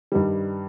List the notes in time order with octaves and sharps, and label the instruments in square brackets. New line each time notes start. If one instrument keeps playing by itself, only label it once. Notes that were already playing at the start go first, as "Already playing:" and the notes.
[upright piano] G2 D#3 G3